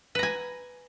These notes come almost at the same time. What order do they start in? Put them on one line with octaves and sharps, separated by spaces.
B4 A#5 G#5